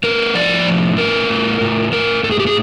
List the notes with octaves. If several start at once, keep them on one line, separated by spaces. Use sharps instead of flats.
A3 A#4
F3 D5
A2
A3 A#4
A2
A2
A2 A#4
A2 A4
G#4
G4
G#4